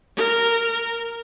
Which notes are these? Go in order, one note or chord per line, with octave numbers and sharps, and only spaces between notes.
A#4